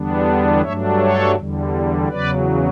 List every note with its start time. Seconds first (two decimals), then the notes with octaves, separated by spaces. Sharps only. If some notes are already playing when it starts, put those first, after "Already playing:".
Already playing: E2 D3 G3 B3 D4
0.61 G2 F#3 A3 D4 C#5 E5
0.98 A4 C#5
1.35 E2 D3 G3
2.08 E2 C#3 F#3 B4 D5